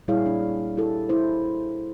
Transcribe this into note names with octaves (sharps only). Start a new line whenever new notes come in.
A#2 G3 E4 G#4 C#5 F5
D4
E4 G4 A4
E4 C5